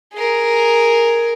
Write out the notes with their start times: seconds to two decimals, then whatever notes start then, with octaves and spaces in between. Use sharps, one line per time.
0.14 G#4 A#4